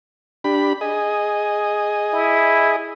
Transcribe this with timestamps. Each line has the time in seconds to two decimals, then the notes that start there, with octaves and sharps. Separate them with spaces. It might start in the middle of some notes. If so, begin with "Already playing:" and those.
0.44 D4 G4 B5
0.81 G#4 D#5
2.13 E4